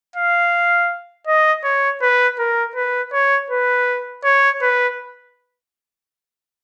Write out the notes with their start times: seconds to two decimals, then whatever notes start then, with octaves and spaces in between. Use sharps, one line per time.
0.16 F5
1.27 D#5
1.64 C#5
2.02 B4
2.39 A#4
2.76 B4
3.13 C#5
3.50 B4
4.24 C#5
4.61 B4